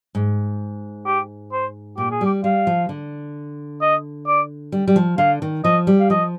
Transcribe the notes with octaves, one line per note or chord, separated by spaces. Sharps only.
G#2
G4
C5
A#2 G4
G#4
G3 G4
G3 F5
F3
D3
D#5
D5
G3
G3
F3
D3 F5
D#3
F3 D#5
G3
F5
F3 D#5